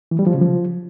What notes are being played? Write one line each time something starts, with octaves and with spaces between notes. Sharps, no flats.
E3
G3
F3
C#3
F3